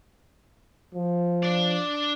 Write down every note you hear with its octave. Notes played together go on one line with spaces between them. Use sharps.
F3
D4 D5